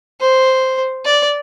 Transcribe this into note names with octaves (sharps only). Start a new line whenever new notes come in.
C5
D5